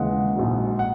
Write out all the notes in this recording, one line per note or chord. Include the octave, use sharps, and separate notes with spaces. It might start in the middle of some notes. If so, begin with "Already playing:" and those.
Already playing: D#2 C#3 E3 G#3 F#5
A#1 G#2 F#3
F#5